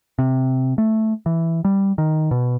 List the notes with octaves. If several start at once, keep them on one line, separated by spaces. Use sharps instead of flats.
C3
A3
E3
G3
D#3
B2